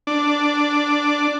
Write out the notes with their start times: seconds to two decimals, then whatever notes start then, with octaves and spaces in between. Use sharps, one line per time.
0.07 D4